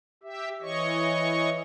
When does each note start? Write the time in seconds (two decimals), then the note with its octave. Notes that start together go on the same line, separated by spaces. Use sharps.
0.23 G4 E5
0.62 E3 C#5 D#5 C#6